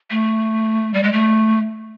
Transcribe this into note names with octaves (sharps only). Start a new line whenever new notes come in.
A3
G3
G#3
A3